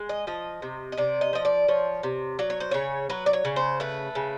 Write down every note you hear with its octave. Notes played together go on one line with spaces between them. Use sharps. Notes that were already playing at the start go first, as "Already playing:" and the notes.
Already playing: G#3
D#5
F3 D#5
C3
D#5
C3 D5
D#5
F3 D#5
D5
F3 C#5
C3
F#3 D5
C#5
C5
C#3 C#5
F#3 B4
D5
C#5
C#3
C5
A3 B4
C#3